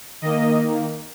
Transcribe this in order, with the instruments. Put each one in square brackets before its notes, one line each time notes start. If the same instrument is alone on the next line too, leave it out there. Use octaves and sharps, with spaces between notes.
[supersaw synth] D#3 A#3 D#5